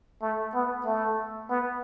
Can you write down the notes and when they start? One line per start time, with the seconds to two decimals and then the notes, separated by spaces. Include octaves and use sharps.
0.22 A3
0.54 B3
0.86 A3
1.50 B3